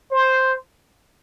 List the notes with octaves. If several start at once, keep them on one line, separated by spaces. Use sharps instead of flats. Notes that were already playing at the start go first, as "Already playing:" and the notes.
C5